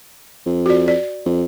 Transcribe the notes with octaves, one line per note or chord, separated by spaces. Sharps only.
F2
F#4 D5
D5
F2